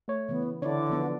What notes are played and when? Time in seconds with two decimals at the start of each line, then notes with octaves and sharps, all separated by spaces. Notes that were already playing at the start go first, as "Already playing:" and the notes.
0.08 A3 C#5
0.29 C#3 E3 B3
0.62 D3 D4 E4 C#5 D5
0.90 F3 B3 D4